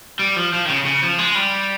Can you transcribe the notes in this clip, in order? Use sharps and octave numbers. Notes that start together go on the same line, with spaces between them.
G3
F3
F3
D#3
C#3
C#3
F3
G#3
G3